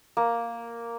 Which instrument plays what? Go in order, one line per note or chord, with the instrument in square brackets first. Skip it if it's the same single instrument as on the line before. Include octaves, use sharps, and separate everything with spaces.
[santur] A#3